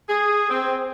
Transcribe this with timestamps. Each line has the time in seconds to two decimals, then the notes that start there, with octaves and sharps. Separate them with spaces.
0.09 G#4
0.50 C4